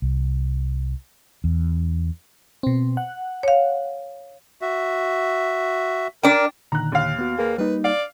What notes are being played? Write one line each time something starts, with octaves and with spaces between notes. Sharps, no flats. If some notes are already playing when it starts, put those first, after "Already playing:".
C2
E2
B2 C4
F#5
C#5 F5
F#4 E5
D4 A#4 G5
A#2 D3 D#3 A#5 F#6
D#2 F5
B3 F#4
A#3 G#4 B4
G3 A#3 D#4 B4
D5 F5